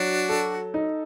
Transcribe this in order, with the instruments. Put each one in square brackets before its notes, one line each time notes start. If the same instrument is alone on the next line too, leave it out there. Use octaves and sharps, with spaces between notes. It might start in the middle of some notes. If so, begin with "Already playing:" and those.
Already playing: [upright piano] F#3 [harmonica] D4 F#4
[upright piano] A4
D#4